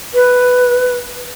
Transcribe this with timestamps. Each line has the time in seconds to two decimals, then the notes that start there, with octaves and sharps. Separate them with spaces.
0.14 B4